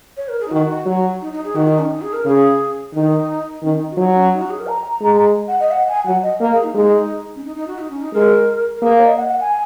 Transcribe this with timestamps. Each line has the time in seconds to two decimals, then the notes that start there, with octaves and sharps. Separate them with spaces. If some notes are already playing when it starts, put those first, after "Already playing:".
0.17 C#5
0.28 A#4
0.40 G#4
0.47 D#4
0.51 D#3 F#4
0.85 F#3
1.21 D#4
1.32 D#4
1.44 G#4
1.55 D#3 F#4
1.67 D#4
1.78 C#4
1.90 D#4
2.01 G#4
2.13 A#4
2.25 C#3 G#4
2.94 D#3 D#4
3.62 D#3 C#4
3.75 D#4
3.90 F#4
3.97 F#3 D#4
4.15 C#4
4.32 D#4
4.41 F#4
4.50 G#4
4.59 A#4
4.67 A#5
5.01 G#3
5.48 F#5
5.60 D#5
5.71 F#5
5.88 G#5
6.05 F#3 F#5
6.23 D#5
6.39 A#3 A#4
6.52 G#4
6.63 D#4
6.74 G#3 D#4
7.35 C#4
7.44 D#4
7.55 D#4
7.67 F#4
7.78 D#4
7.90 C#4
8.01 D#4
8.13 G#3 A#4
8.76 A#4
8.82 A#3 G#4
8.98 C#5
9.05 D#5
9.17 F#5
9.28 F#5
9.40 G#5